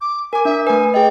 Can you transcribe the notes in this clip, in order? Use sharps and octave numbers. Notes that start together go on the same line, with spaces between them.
D6
A#4 G#5 D6
D4 E5
A3 B4 G#5
G#4 D#5 G5